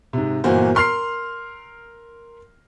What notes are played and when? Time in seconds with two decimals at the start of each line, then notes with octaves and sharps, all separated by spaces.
0.13 G#2 C3
0.44 G1 A#2 E3 A#3 F#4 C5
0.75 A#4 C6 F6 C7